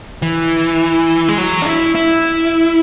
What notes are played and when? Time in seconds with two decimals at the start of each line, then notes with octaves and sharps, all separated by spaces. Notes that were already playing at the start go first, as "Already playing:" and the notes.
0.22 E3
1.28 G#3
1.38 F#3
1.62 D4
1.66 E4
1.95 E4